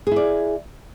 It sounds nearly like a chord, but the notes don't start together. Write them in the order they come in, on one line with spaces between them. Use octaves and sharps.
G#4 E4 D5